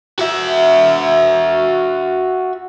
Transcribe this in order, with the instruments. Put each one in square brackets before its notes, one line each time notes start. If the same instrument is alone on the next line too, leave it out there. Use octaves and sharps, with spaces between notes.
[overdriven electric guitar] F#4 E5